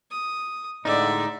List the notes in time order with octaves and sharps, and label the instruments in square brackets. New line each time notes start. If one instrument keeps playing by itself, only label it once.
[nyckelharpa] D#6
[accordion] A2 D3 G#3 [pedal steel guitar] D#4 [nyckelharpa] D5 E5